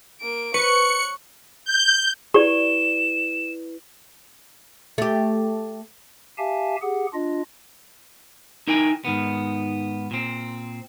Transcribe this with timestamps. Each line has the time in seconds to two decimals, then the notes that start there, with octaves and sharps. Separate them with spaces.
0.21 A#3 D7
0.54 B4 C#5 C#6 F#6 C#7
1.65 G6
2.34 E4 G4 G#4 B4 D5 E7 G7
4.98 A3 G4
6.38 G4 E5 F5 G#5 A5
6.82 G4 G#4 F#5
7.14 D4 F4 D#5
8.67 D#4 E4 A#4 G5 G#5
9.05 G#2 D#3 B3
10.11 A#2 C4